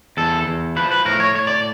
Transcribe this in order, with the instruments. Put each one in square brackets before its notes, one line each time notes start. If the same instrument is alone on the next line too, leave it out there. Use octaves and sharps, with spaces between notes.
[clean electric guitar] E2 A4
E2
F3 B4
B4
A2 A#4
C#5
A2 C#5
D5